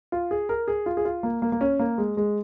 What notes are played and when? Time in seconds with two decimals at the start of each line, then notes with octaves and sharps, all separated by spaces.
0.12 F4
0.31 G#4
0.49 A#4
0.68 G#4
0.86 F4
0.97 G#4
1.05 F4
1.23 A#3
1.42 A#3
1.52 A#3
1.61 C#4
1.79 A#3
1.98 G#3
2.17 G#3